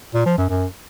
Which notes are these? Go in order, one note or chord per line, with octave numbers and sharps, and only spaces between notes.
A#2
F3
F#2
F#2